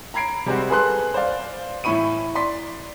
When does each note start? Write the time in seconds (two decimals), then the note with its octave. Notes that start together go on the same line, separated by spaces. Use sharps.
0.14 A#5 B5 G#6 C7 D7
0.46 C3 G3 G#3 C4 F#4
0.70 G#4 A4 B4 C6 F#6
1.14 C5 D5 F5
1.84 A2 E3 E4 B5 C#6 D#7
2.35 D5 C6 B6